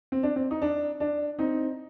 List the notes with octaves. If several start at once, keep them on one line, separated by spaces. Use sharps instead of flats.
C4
D4
C4
D#4
D4
D4
C4 D#4